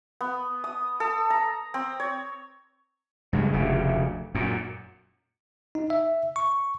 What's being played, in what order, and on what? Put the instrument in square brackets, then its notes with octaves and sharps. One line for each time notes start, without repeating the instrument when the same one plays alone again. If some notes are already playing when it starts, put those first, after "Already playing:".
[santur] B3
D#6
A4
A#5
C4
C#5
[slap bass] G2 C#3 G#3
F1 D2 C#3
F#2 A#2
[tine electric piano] D#4
E5
C#6